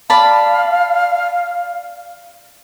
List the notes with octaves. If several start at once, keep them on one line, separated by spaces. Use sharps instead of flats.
D5 F5 A5 B5